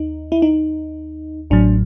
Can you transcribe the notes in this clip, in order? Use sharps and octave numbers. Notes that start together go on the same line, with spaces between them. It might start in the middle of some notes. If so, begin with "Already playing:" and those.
Already playing: D#2 D#4
E4
D#4
A1 A2 F#3 D4